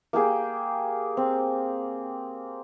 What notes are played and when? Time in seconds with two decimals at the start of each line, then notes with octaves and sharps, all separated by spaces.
0.13 A#3 G4 G#4 G5
1.17 C4